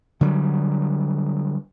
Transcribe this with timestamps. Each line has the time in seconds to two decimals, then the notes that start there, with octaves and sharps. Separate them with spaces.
0.21 D3 F#3 G3